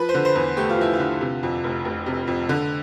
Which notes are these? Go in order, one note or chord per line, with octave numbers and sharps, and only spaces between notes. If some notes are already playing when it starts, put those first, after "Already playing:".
Already playing: F3 B4
C5
D3
C5
E2
A3 G4
F4
F3 E4
F4
D3
C3
F2
F1
F1
C3
F2
D3